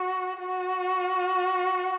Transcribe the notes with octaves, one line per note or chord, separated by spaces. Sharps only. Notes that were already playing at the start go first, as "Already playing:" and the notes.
Already playing: F#4
F#4